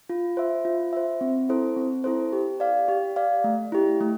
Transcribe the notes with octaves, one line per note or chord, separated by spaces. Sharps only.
F4
C5 E5
F4
C5 E5
C4
E4 A4 C5
C4
E4 A4 C5
G4
D5 F5
G4
D5 F5
A3
E4 G4
A3